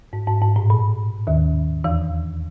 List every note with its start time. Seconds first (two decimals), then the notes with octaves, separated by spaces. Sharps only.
0.13 G#2
0.27 G#2
0.42 G#2
0.56 A2
0.70 A#2
1.27 D#2 D#3
1.84 E2 E3